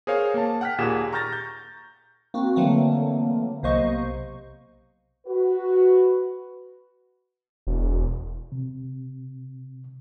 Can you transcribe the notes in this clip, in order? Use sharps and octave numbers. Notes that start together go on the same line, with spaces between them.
G#4 A#4 C5 C#5 F5
A#3 A5
F#5 G5 F6 F#6 B6
D#2 A#2 G4 G#4 E7
A#5 C#6 F6 G6 A6 A#6
G6
A#3 C4 F#4
D3 E3 F#3 A3 A#3 C4
B1 C3 A#3 C5 D#5 C#6
F#4 B4
E1
C3